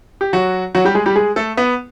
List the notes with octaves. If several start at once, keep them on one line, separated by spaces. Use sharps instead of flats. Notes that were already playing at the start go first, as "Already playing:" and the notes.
G4
F#3 F#4
F#3 F#4
G3 G4
G#3 G#4
G3 G4
G#3 G#4
A3 A4
B3 B4